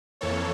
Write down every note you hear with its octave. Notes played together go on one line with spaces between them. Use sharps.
F2 E3 A#3 A4 C#5